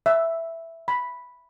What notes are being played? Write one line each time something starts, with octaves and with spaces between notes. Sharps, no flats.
E5
B5